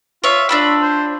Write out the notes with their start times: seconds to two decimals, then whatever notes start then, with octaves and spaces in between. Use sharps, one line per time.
0.24 F4 C#5 E5
0.49 D4 F4 B5 E6
0.81 C5